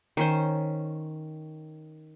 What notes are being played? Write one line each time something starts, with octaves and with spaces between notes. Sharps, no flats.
D#3 C#4 C5